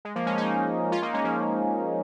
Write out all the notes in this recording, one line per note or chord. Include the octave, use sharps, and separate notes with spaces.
G#3
F3 A#3
G#3 C#4
A#3 D#4
C#4 F4
A#3 D#4
G#3 C#4
F3 A#3